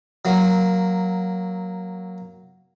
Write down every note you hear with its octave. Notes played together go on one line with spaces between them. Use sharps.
F#3 A#3